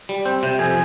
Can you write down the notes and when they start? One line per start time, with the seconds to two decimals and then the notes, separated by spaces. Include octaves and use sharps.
0.09 G3
0.25 C4 G6
0.43 C3 G6
0.59 F2 G#5 G#6